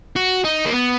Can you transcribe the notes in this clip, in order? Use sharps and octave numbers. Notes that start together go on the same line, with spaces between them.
F#4
D#4
A#3
B3